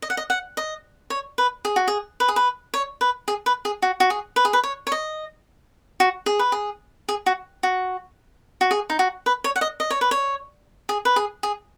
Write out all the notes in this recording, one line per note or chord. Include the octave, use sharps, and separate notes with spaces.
D#5
F#5
D#5
F#5
D#5
C#5
B4
G#4
F#4
G#4
B4
G#4
B4
C#5
B4
G#4
B4
G#4
F#4
F#4
G#4
B4
G#4
B4
C#5
C#5
D#5
F#4
G#4
B4
G#4
G#4
F#4
F#4
F#4
G#4
D#4
F#4
B4
C#5
F#5
D#5
D#5
C#5
B4
C#5
G#4
B4
G#4
G#4